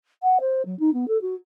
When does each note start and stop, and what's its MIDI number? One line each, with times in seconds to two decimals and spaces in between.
0.23 0.38 78
0.40 0.62 72
0.65 0.78 54
0.79 0.93 63
0.93 1.08 59
1.08 1.20 69
1.21 1.35 66